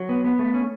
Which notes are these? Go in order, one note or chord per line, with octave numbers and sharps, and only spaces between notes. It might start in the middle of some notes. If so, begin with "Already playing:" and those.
Already playing: F#3
B3
B3
A3
C#4